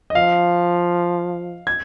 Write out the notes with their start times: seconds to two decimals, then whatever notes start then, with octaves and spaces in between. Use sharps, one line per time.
0.10 D#5
0.15 F3 F5
1.67 G#6